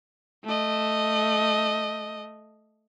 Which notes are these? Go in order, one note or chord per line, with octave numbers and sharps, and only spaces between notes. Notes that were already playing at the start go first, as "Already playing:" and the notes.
A3 D#5